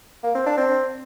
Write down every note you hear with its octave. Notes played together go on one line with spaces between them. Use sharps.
A#3
C4
D4
C4